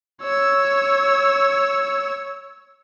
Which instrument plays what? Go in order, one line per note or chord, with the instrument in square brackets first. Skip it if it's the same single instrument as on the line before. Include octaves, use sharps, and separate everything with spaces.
[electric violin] C#5 E6